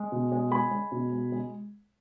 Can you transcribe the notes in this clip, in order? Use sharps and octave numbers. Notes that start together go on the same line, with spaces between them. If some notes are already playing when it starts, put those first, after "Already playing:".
Already playing: G#3
B2
G#3
G#3 G#5 B5
G#3
B2
G#3
G#3